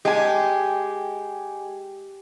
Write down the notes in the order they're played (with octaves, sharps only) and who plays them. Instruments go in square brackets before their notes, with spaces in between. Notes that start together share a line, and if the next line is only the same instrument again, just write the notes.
[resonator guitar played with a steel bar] G#3 G#5 [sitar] G4